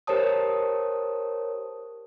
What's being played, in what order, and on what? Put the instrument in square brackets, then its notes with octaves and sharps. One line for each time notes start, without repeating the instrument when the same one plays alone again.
[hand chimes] G4 A#4 C5 C#5 A5 D#6